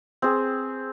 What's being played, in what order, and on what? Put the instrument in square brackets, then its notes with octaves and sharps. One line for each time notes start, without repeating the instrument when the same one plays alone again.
[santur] C4 G#4